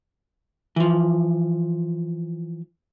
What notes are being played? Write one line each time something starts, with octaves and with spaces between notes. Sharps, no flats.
E3 F3